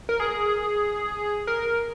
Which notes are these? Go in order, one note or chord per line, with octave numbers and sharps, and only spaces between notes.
A#4
G#4
A#4